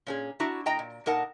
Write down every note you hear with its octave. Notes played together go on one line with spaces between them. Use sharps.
A#2 C#4 G#4
D4 E4 F#4 A#5
A2 D#5 G5 A#5
A#2
A#2 D#4 A#4 F#5 A5